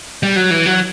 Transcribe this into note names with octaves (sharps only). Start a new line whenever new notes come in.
G3
F#3
E3
F#3